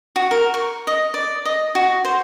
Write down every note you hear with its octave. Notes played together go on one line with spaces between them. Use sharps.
F#4
A#4
C#6
D#5
D5
D#5
F#4
C5